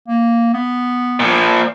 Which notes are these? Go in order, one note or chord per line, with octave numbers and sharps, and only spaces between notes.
A#3
B3
A#2 F3